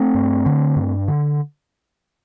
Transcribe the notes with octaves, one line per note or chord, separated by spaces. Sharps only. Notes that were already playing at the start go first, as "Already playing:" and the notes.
Already playing: A3 C4
G2
D3
G2
D3